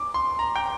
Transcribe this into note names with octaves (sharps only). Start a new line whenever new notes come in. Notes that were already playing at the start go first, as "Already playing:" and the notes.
Already playing: D6
C6
A#5
G5